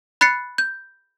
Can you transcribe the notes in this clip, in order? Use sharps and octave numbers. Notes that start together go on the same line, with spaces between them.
B5 F#6 A6 C7 C#7
G6